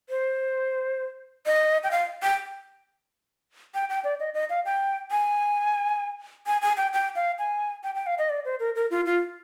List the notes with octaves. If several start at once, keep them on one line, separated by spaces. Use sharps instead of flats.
C5
D#5
G5
F5
G5
G5
G5
D5
D#5
D#5
F5
G5
G#5
G#5
G#5
G5
G5
F5
G#5
G5
G5
F5
D#5
D5
C5
A#4
A#4
F4
F4